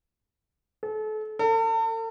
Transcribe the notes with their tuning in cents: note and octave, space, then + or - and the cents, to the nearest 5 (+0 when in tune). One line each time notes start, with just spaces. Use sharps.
A4 -35
A4 +45